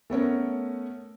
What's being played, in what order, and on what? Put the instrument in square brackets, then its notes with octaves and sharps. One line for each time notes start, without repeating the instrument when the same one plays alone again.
[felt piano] A3 B3 C#4 A#4